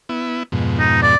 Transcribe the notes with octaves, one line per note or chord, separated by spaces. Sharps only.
B3 E4
F2 G#2 B2
D#4
D5